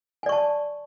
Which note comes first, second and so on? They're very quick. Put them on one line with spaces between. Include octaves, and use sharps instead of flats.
G#5 D5 C#6 A5